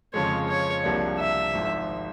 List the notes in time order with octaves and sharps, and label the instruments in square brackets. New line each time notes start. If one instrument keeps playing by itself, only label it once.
[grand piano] F2 C#3 F3 G#3 [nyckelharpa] C#5
[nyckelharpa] C#5
[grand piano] C2 C3 F3 A#3 D4
[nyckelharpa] E5
[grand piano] G#1 G#2 F3